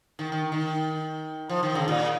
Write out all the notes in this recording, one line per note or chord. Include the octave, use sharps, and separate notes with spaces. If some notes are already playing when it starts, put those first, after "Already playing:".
D#3
D#3
D#3
F3
D#3
C#3
A#2